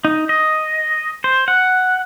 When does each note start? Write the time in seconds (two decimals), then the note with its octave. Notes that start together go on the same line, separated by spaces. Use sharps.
0.05 D#4
0.29 D#5
1.24 C5
1.48 F#5